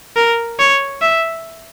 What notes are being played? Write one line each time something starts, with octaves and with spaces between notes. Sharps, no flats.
A#4
C#5
E5